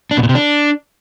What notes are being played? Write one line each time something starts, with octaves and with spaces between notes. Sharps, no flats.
D4
B2
A#2
C3
D4